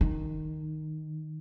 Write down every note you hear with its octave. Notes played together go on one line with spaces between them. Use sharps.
D#3